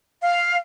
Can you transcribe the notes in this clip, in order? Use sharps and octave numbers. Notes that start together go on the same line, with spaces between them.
F5